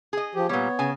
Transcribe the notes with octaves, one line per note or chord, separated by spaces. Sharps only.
G#4 D#5
F3 G4
A#2 G3 B3 C#5
C#3 G#5